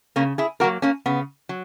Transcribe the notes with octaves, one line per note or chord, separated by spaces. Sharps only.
C#3 A#3 C#4
E4 G#4
F#3 A#3 F#4 A#4
A#3 C#4
C#3 B3
F#3